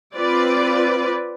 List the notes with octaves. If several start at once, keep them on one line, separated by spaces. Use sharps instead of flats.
C4 F4 B4 D5